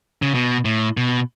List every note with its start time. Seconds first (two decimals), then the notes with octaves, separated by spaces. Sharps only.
0.22 C#3
0.34 B2
0.65 A2
0.97 B2